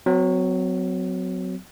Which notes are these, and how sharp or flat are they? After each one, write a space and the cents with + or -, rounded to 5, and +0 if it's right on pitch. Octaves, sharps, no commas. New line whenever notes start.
F#3 +0 C4 -40